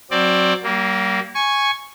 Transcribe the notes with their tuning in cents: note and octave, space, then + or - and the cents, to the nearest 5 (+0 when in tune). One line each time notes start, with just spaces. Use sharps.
F#3 +0 C4 +15 D5 +0
G3 -40 A#3 +0
G#5 +0 C#6 -5